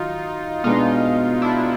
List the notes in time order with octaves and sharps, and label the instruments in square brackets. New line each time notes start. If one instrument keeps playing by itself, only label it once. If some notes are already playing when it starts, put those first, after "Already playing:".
Already playing: [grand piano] D#3 F#3 [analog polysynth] D#4 F4
[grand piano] B2 G#3 B3 D4 [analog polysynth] D#4 F4
[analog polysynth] D4 E4